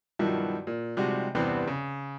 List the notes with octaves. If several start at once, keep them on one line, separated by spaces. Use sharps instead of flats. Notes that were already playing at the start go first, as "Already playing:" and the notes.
G2 B2 D#3 F3 F#3 E4
A#2
C3 F3 G3 G#3 D#4 F#4
E2 G2 C3 G3 B3 C4
C#3